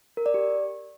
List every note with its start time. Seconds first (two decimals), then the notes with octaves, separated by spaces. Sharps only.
0.17 A#4
0.26 D5
0.34 G4